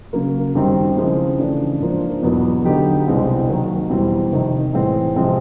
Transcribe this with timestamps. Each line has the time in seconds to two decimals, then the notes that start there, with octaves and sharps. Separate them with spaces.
0.13 C#3 F#3 A#3
0.55 F#2 D#3 G3 C4
0.97 C#3 F3 G#3 C4 E4
1.38 C#3 E3 A3 D4
1.80 G#2 F3 A#3 D4
2.22 E2 B2 F#3 B3
2.64 D3 F#3 B3 D#4 G4
3.06 C2 B2 G#3 C4 E4
3.49 D#3 F#3 A#3
3.90 E2 B2 G3 C4 E4
4.32 F2 C3 D#3
4.73 A2 E3 G#3 C4
5.16 C3 F3 G#3 C4